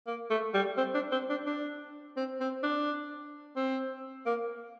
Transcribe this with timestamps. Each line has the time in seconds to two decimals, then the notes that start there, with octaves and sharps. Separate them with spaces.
0.07 A#3
0.30 A3
0.54 G3
0.77 C4
0.94 D4
1.12 C4
1.30 D4
1.46 D4
2.17 C4
2.40 C4
2.63 D4
3.56 C4
4.26 A#3